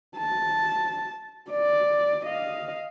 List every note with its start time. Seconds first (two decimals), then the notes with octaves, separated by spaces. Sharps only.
0.17 A5
1.50 D5
2.25 D#5 F5